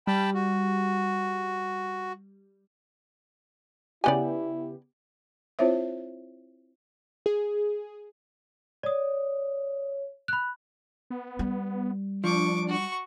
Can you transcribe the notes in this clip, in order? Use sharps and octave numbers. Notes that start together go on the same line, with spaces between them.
G3 G5 A5 B5
F#4
C#3 B3 E4 G4 D5 D#5 G#5
C4 E4 F4 C5 C#5 E5
G#4
C#5 D5 D#6
B5 F#6
B3
G3
F3 D4 C#6 D6
F#4 C#6